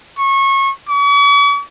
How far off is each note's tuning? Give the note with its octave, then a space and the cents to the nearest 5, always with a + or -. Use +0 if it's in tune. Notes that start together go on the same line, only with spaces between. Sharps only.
C#6 -25
C#6 +45